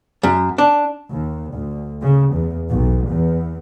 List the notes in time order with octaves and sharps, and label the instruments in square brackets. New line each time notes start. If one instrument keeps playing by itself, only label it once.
[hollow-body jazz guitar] F#2
D4
[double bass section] D#2
D2
C#3
E2
B1
E2